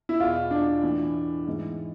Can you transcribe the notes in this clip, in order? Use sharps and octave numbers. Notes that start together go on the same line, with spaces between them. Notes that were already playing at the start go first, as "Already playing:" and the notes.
E4
E2 B2 F4
D4
A2 E3
G#2 E3